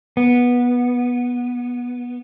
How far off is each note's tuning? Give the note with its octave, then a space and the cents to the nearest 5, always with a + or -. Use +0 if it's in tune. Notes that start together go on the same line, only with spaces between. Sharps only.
B3 -15